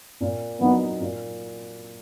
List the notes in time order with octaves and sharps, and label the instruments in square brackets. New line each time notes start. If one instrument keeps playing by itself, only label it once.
[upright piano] A#2
[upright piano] F#3 A#3 D#4 [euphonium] B3
[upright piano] A#2